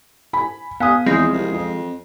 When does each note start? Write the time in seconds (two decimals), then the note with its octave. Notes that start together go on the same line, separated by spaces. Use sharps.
0.33 G#5 B5
0.80 B3 F5 G#5 D#6
1.06 E2 F3 G#3 C4 A#6 C7
1.33 C2
1.53 F2